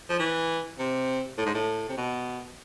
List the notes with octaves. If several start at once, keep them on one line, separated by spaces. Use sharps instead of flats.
F3
E3
C3
A2
G#2
A2
C3
B2